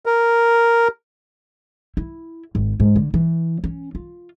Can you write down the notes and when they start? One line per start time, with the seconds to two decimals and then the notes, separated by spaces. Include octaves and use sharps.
0.06 A#4
1.97 E4
2.55 G#1
2.80 G#2
2.96 D3
3.14 E3
3.64 C#4
3.95 F4